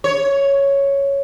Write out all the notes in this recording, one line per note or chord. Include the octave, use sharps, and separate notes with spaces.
C#5